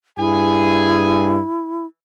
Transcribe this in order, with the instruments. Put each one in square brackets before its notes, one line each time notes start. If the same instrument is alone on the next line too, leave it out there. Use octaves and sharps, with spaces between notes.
[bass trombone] G2 [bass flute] E4 [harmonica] G#4 G#5